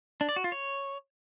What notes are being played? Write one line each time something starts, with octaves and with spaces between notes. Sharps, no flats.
D4
D5
F#4
F4
C#5